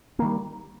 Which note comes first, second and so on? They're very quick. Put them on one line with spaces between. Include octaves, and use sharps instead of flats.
A#3 D#3 G3